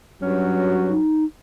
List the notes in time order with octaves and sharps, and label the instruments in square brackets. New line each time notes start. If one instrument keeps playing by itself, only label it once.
[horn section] G2 C#4 F#4 [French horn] F#3
[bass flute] D#4